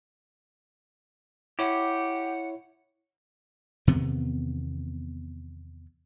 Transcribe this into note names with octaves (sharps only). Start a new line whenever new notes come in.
E4 G4 C#5 F#5
E2 C3 D#3 B3